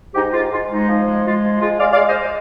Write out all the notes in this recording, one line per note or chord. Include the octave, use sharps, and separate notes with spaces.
G#2 D#4 G4
G#2 F4
G#2 F4
G#3 D#4
F3
G#3
G#3 F4
F3
G#3 F4 G#4
G#3 D5 F5
D5 F5
G#3
C5 D#5
G#3